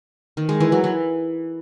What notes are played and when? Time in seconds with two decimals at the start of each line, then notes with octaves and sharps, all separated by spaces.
0.37 D#3
0.49 G#3
0.60 E3
0.72 F#3
0.84 E3